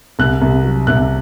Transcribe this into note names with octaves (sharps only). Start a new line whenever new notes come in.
C2 F#6
C2
F#3
C2 F#6